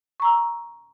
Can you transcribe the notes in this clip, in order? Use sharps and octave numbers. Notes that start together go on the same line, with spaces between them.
A#5 C#6 E6